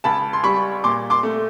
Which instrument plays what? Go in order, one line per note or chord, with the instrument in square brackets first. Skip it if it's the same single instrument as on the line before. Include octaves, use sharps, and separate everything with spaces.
[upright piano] C#2 A5 B5
C6
G3 B5 C#6
A#2 C6 D6
C6 D6
A3